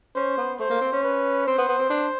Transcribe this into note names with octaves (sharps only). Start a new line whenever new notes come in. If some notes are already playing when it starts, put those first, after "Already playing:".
C#4 C5
B3
A3 C5
A#3
C4
C#4
B4
C4 C5
B3
B3
C4
D4